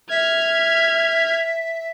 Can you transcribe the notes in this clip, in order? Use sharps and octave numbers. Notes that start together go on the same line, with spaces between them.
E5 F6 G#6